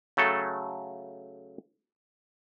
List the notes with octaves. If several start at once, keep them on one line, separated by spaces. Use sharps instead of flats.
C#3 F#3 A3 A4